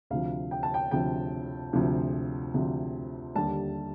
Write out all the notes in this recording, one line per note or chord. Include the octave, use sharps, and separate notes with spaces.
D2 C3 F3 F5
G5
A5
G5
D2 C3 F3 G5
D2 C3 F3
D2 C3 F3
D#2 D3 G3 A5